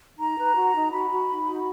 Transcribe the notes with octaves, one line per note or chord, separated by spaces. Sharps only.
D#4 A#5
B4
F#4
D#4
F#4 B5
F#4
D#4
F#4